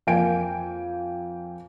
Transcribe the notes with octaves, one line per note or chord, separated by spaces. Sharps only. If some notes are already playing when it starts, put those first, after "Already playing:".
F2 A#3 F5 G5 G#5 D7